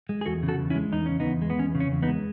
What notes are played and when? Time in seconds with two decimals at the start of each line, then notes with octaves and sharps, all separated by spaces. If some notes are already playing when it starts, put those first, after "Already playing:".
0.09 G#3
0.21 G#4
0.26 E2 F#4 A4
0.43 C#3
0.48 F#4 A4
0.59 E2
0.70 C#4 E4
0.75 G#3
0.92 E2 D#4
1.06 C#3 C#4
1.20 B3 D#4
1.26 E2
1.42 G#3
1.50 B3
1.59 E2 C#4
1.75 C#3
1.80 C#4
1.92 E2
2.02 B3 D#4
2.08 G#3